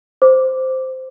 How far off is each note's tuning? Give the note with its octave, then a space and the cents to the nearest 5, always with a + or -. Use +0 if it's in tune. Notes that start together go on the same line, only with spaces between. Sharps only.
C5 -5 D6 +0